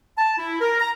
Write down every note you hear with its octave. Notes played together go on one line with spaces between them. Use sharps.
A5
E4
A#4
A#5